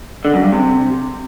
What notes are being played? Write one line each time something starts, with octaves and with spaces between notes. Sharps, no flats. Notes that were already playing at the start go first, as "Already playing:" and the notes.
D3
F#2
G2
C3